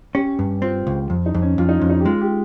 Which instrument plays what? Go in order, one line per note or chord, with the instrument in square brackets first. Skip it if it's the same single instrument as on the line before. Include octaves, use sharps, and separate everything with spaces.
[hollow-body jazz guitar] C#4 [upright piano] G4
[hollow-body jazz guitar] G2
[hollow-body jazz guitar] C4 [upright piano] F4
[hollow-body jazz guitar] C#2
F2
[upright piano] D#4
[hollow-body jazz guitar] F2
[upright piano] C#4
[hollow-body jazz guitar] F2 [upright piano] F4
[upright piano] D#4
[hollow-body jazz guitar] F2 [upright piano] C#4
[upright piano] D#4
G4
[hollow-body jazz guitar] G#3 [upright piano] F4
[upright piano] G4